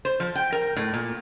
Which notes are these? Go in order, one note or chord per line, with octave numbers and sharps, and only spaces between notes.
C5
F3
G5
A#4
A2
A#2